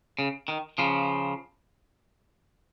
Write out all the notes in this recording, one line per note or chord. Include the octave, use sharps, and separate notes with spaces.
C#3
D#3
C#3 F3